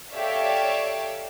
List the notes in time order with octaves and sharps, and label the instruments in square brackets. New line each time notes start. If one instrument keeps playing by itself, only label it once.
[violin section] G4 A4 C#5 D5 E5 F5